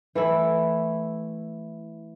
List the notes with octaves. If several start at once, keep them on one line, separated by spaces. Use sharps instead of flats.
E3 A3 E4